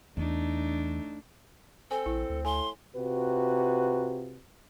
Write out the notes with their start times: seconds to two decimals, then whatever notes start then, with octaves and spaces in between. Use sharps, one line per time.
0.17 E2 A3 D4 D#4
1.91 C4 A4 G#5
2.06 A#1 E4
2.30 D2
2.45 A2 G#5 C6
2.95 C3 F4 F#4 B4